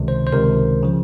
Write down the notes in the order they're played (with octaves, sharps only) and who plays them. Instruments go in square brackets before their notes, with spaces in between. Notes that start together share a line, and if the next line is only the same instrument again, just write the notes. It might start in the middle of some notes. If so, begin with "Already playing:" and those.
Already playing: [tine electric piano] C#2 C3 D#3
C5
C5
C#2 C3 D#3 A#4
C#3 F3